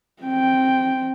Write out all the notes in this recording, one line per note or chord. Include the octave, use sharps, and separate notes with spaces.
C4 G5